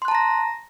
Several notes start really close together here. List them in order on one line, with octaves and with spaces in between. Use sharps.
C6 F#6 A5 A#5 A#6